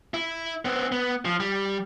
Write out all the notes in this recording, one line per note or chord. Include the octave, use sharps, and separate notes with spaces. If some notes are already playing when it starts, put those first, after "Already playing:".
E4
B3 C4
B3
F3
G3